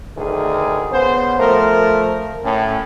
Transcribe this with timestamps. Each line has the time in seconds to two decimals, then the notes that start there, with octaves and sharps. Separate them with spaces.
0.17 D2 D#3 G#4
0.91 C#3 B3 C5
1.39 F3 A3 A#4
2.44 A2 C#4